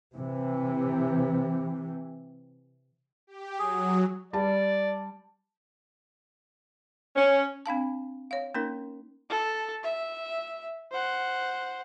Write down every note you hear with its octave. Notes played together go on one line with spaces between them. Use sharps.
C3 E3
G4
F#3 G#4
G3 D5 A5
C#4
C4 D4 F5 A5
C#5 F5
A#3 C#4 D#4 A#4
A4
E5
C5 F#5